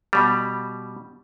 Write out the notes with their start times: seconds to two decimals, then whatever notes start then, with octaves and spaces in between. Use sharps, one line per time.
0.13 B2 G3